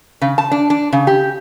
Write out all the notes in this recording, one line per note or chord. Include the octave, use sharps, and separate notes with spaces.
C#3
A5
D4
D4
C#3
G4